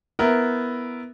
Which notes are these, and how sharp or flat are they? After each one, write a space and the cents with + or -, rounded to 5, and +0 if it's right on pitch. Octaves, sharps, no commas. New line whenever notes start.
B3 +0 E4 +0 A#4 +0